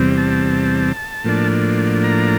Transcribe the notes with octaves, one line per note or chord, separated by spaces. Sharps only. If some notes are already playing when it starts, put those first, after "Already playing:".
Already playing: E2 C3 G3 C4
A5
A2 F3 A#3 D4
A#5